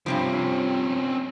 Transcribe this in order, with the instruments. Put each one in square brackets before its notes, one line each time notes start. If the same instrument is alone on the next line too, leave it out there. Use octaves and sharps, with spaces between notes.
[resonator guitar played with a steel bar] G2 C3 F3 [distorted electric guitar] C4 C#4